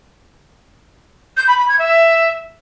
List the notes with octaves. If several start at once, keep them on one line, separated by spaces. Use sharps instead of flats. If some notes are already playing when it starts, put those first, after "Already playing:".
G6
B5
B5
G#6
E5